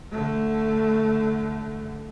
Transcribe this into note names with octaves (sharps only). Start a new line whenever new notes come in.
D3 A3